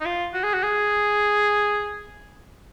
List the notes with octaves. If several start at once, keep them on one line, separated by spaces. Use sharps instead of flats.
D#4
F4
F#4
G#4
F#4
G#4